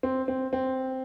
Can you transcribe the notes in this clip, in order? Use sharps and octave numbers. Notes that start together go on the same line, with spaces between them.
C4
C4
C4